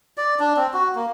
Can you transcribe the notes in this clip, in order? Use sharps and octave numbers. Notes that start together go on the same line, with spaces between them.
D5
D4
C4
F#4
A#3